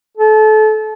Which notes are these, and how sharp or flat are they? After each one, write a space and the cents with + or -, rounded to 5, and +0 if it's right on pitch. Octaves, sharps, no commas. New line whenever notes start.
A4 -30